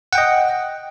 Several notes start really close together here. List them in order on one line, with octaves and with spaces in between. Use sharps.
F#5 G5 D#5